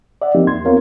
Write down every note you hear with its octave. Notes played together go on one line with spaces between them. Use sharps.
D5 E5 F#5
F3 A#3 C4 D#4 G4
E2 C6 G#6
B3 C4 F4 A#4 C#5 F5